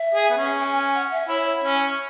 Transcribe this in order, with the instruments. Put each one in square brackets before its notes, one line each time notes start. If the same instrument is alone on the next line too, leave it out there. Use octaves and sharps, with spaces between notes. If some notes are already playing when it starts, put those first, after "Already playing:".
Already playing: [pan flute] E5
[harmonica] G#4
B3
C#4
[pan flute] G#5
G#5
F#5
E5
[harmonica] E4 [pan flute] C#5
[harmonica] C#4